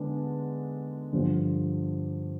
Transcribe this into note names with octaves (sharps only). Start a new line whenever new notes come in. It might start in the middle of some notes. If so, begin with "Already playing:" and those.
Already playing: D3 G#3 B3 D4
G2 D3 F3